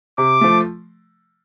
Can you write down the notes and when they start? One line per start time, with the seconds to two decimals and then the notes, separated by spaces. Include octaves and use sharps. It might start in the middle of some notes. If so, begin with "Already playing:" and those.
0.18 C3 D6
0.41 F3 A3